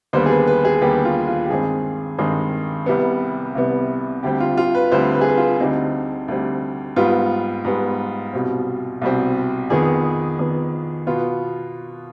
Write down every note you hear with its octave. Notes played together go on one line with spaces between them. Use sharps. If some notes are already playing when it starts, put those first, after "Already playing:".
D#2 D3 G3 B3 C5
G#4
B4
B4
G#4
D#2 D3 G3 B3 G4
F4
F4
G4
G2 D#3 G#3 C4 G#4
G2 D#3 G#3 C4
C2 C3 G3 B3
C2 C3 G3 B3
D2 D3 G3 C4 G4
F4
F4
B4
D2 D3 G3 C4 C5
B4
G#4
B4
F4
D2 D3 G3 C4 D#4
D2 D3 G3 C4
G#2 G3 B3 F4
G#2 G3 B3
C2 B2 G3 C4
C2 B2 G3 C4
F2 D#3 B3 G#4
F2 D#3 B3
B2 B3 F4